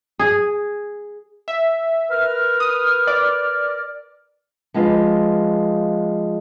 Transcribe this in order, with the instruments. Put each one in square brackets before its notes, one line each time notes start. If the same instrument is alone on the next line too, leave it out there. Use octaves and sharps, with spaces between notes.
[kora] G#4
[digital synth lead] E5
[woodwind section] A#4 B4 F6
[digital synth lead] D#6
D5
[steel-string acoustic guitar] F3 G#3 F4 B4